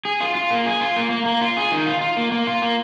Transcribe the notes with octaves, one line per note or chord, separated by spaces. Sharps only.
G#4
F4
F4
A#3
G#4
F4
A#3
A#3
A#3
F4
G#4
D#3
F4
F4
A#3
A#3
F4
A#3